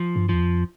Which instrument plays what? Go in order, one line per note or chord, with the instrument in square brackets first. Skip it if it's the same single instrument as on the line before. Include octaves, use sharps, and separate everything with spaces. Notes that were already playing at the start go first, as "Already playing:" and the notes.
Already playing: [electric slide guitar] F3
[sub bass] G2
[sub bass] E2 [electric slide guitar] F3
[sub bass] F2